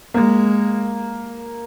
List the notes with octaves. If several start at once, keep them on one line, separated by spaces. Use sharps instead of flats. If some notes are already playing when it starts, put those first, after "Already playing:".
G#3 A#3